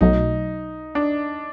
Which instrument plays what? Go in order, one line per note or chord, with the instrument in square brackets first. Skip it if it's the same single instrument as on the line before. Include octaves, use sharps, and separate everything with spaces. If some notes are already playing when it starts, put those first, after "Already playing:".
[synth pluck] B1 B2 F#3 A3 [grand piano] D#4
[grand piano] D4